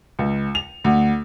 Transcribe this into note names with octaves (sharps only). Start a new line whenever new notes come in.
C#2
F7
D2